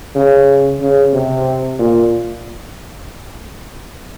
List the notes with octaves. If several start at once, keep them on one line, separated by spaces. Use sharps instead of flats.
C#3
C#3
C3
A#2